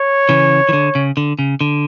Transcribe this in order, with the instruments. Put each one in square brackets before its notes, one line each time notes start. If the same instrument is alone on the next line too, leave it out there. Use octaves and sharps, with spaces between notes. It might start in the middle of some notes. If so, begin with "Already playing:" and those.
Already playing: [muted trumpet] C#5
[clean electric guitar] C#3 E3
E3
D3
C#3
D3
C#3
D3